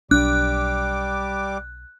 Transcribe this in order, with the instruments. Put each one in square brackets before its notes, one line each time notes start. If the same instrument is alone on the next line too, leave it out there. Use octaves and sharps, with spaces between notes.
[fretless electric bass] B1 D4 [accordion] G3 D6 [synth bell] F#6